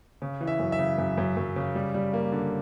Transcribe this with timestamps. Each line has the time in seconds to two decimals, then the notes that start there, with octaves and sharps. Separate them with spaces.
0.22 C#3
0.41 E3
0.47 E5
0.59 F#2
0.72 E5
0.79 C#3
0.98 F#2
1.18 F#2
1.37 F#2
1.56 C#3
1.75 G3
1.94 G3
2.13 A#3
2.32 D3